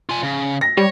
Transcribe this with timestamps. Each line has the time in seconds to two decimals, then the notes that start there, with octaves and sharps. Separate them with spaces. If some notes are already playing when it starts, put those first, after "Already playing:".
0.09 F4 G#5
0.23 C#3
0.61 A#6
0.77 G3 C#5